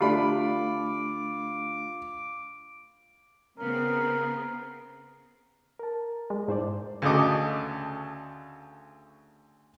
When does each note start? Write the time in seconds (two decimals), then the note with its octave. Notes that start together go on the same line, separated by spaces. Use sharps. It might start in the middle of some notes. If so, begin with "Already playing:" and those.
0.01 D3 A3 D4 F4 G4 B5 D6
3.58 C#3 B3 C4 A#4
5.79 A#4 A5
6.30 G#3
6.48 G#2 E4 C5 D5
7.02 D2 C#3 A4 D#5 D6